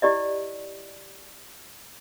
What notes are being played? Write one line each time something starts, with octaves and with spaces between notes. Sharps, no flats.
E4 G4 D5 D#5